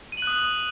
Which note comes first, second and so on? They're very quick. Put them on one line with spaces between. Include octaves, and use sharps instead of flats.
D#7 F#7 F#6 D#6